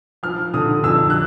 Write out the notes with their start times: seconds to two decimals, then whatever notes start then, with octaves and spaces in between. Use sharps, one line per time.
0.23 F3 F6
0.54 D3 D#6
0.84 F2 E6
1.10 F#6